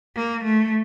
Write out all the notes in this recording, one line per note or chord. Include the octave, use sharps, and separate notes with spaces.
A#3
A3